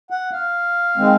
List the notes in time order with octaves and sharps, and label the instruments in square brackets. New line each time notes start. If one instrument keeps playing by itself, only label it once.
[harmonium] F#5
F5
D#3 G#3 C4